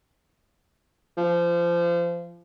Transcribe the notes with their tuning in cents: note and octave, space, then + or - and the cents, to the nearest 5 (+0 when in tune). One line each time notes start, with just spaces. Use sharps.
F3 -25